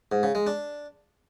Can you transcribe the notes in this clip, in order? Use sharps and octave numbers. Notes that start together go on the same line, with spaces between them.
G#2
C#3
G#3
D4